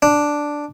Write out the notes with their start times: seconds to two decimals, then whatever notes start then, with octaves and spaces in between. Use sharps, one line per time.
0.02 D4